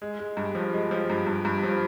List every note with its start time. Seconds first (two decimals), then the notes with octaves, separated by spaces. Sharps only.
0.02 G#3
0.19 G#3
0.37 G2
0.55 F3
0.74 G#3
0.91 F3
1.10 G2
1.27 G2
1.45 G2
1.63 F3